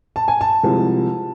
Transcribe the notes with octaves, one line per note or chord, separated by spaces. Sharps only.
A5
G#5
A5
C2 C3 F3 G#3